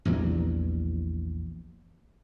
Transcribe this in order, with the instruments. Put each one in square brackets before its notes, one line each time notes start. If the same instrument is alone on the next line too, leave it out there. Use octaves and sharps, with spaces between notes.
[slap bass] A#1 E2 E3 G3